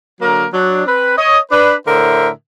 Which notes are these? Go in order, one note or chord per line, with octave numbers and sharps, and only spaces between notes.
D3 F#3 A#3 A#4
F#3 D4
C4 B4
C#5 D#5
D4 B4
A2 D3 A#4 C5 E5